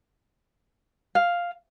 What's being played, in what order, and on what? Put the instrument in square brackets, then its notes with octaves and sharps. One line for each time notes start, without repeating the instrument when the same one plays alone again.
[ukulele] F5